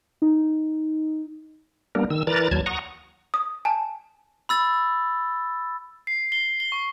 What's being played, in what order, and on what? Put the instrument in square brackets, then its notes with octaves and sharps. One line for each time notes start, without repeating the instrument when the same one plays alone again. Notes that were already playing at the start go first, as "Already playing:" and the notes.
[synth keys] D#4
[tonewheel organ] G3 A#3 B3 D4 A#4
D#3 E6
E3 A#4 B4 D5 A#5 A6
D#2 F#3 A5 G#6
F#5 A#5 C#6 D#6
[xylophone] D#6
G#5 A5
[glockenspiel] B5 E6 A6
[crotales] C7
C7 G7
G7
C#6